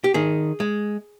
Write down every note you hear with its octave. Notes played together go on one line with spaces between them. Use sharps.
G4
D#3 G#4
G#3